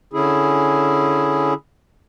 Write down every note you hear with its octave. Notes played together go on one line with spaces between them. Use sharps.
D3 C#4 E4 G#4